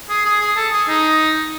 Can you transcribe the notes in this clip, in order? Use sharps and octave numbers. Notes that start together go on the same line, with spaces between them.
G#4
G#4
G#4
A4
G#4
D#4